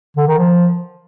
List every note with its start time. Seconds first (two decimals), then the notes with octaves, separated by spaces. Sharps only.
0.17 D3
0.27 D#3
0.38 F3